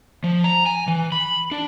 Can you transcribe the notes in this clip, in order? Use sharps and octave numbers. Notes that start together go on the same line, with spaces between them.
F3
A#5
G#5
E3
B5
D4